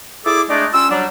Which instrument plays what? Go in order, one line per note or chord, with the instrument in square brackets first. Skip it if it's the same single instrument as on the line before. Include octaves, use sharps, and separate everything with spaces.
[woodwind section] E4 G#4 A4 D5 D6
G#3 A3 D4 D#4 G#4 D5
G3 C#4 F4 E6
F#3 G3 D4